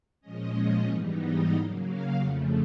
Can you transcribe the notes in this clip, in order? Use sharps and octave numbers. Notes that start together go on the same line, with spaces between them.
A#2 F3 G#3 C#4 D#5
G#2 E3 G3 B3 D#4
D#5
C#3 F#3 A#3 F5
F5
F2 C#3 F3 A3 F#5